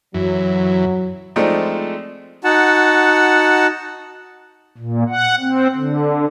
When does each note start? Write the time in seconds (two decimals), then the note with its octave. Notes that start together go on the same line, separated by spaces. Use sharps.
0.14 F#2 E3 F#3
1.36 F3 G#3 A3 C4 D4 D#4
2.44 D#4 F#4 F#5 A5
4.78 A#2
5.09 F#5
5.40 C4
5.75 D3